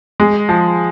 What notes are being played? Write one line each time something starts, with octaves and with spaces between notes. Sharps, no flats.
G#3
F3